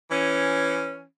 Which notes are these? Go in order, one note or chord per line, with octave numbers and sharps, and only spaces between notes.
E3 C#4